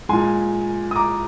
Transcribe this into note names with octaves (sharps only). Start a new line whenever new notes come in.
A#2 G#3 G#5 C6
D#6
A#5 D6